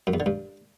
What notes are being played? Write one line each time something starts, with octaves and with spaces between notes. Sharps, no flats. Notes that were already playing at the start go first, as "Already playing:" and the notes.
F#2
E2
D3
G2